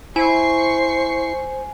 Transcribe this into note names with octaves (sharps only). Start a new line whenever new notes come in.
E4 C5 G#5 C#6 C7